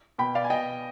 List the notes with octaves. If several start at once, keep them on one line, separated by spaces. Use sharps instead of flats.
B2 G5 B5
D5 F5
G#5
B2 D#5 G5